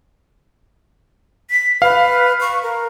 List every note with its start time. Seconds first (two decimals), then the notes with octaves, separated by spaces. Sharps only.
1.50 B6
1.82 B4 F5
2.41 C#6
2.63 A#4